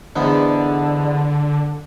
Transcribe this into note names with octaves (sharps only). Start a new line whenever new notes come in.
E2 G#2 D3 B3